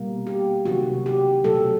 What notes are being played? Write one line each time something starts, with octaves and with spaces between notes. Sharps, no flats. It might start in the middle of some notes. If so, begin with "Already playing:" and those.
Already playing: B2 G3 A#3
G4
C3 D#3 F#3 A#3 F#4
G4
B2 F#3 A3 A4